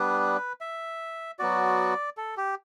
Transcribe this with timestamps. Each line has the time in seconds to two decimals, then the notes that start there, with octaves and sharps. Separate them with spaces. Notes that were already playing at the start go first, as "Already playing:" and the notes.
Already playing: G3 B3 D4 B4
0.61 E5
1.39 F#3 B3 F#4 D5
2.17 A4
2.37 G4